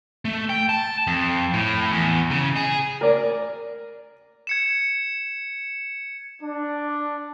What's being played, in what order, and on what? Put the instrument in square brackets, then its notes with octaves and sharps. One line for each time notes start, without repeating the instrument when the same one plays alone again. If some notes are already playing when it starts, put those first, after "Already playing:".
[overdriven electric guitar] A3
G5
A5
F2
A2
E2
C#3
G#4
[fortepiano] A#4 D5
[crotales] G#6 C#7 E7
[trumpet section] D4